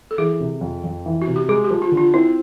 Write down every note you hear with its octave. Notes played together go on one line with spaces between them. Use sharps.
A4
E3 G#4
C3
F2
F2
E3
F#4
C3
G4
G#3 G#4
G4
F3
F4
D3
F4
C4 E4